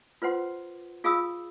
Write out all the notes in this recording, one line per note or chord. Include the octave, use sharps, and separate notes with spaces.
F4 B4 C5 F#5 C6
F4 G#4 F5 B5 D#6 E6